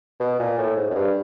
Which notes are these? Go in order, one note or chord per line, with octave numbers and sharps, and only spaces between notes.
B2
A#2
A2
G#2
F#2
G2